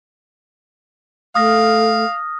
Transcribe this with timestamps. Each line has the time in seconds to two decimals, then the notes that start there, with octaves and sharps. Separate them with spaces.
1.35 A3 F5 D#6 F6 A#6